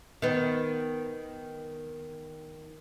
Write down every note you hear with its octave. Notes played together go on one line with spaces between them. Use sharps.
D#3 B3